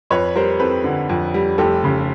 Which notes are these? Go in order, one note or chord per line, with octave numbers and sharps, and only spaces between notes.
F2 B4 C#5
G3 A#4 C5
C4 A4 B4
D3
F2
G3
F1 G4 A4
C#3